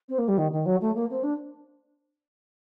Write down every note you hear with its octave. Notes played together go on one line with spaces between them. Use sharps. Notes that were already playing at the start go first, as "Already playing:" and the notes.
C4
A#3
G3
D#3
D#3
F#3
A3
A#3
C4
D4